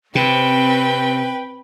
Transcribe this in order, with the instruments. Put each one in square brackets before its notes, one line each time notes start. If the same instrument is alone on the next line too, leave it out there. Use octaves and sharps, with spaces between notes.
[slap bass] C3 [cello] C4 C#4 [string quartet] B4 [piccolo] G5